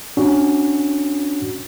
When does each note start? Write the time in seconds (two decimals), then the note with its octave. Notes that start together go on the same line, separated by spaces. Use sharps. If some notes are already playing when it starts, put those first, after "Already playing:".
0.17 C#4 D4 F#4